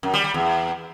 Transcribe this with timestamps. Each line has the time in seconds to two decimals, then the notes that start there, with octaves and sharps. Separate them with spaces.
0.03 F#2
0.13 G3
0.24 G3
0.34 E2